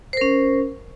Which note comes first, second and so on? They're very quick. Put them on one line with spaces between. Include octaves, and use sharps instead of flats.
C5 A#4 C#4